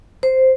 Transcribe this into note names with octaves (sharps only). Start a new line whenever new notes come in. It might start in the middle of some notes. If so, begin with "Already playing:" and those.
C5